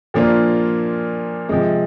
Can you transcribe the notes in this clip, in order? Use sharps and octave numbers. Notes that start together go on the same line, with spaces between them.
A#2 F3 A#3 D4 F4
C3 F3 G#3